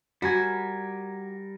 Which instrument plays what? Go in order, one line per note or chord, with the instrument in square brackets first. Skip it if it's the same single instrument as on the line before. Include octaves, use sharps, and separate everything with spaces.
[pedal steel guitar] G3 A#4 G#5 [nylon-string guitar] F#4